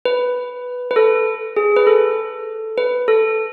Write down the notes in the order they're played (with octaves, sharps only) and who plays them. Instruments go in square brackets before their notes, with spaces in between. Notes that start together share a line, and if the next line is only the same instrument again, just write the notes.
[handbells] B4
B4
A4
G#4
B4
A4
B4
A4